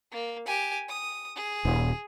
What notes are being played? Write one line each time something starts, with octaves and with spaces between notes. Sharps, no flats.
A#3
G4 G#5
D#6
G#4
D#1